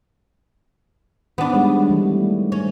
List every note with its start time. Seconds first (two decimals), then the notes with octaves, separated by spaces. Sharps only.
1.38 D#3 B3 D4
1.53 G3 G#3 C#5
1.90 E3 G3 A3
2.52 C#4